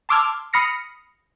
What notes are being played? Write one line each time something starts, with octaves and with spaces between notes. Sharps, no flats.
A5 C6 D6 E6 F6 G#6
B5 D#6 F6 A#6 C7 C#7